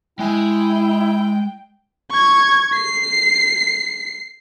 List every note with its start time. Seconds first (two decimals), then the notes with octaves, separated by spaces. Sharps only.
0.19 G#3 E4 G5 G#5
2.11 C#6 G#6
2.74 C7